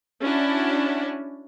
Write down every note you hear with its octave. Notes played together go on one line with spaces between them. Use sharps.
C#4 D4 E4 F#4